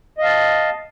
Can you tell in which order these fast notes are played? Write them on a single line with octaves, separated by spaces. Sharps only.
D#5 F5 A5